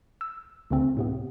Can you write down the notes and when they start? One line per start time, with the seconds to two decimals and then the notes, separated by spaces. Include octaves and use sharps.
0.21 E6
0.70 C#2 C#3 A3 C4
0.97 A2 C3 B3